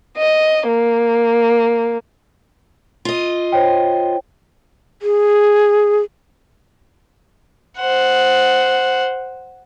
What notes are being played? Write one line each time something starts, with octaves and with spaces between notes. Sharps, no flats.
D#5
A#3
F4 D#5
C5 C#5 G5
G#4
C5 F#5